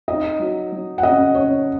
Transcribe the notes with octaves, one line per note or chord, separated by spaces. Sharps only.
D#4 D#5
F#3
F#3
F#5
C#3 D#5
C#4 C#5